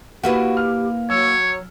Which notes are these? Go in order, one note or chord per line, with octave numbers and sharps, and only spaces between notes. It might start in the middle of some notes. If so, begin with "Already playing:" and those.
A#3 E4 F#4 G4 B4
F6
F#3 C#5 E6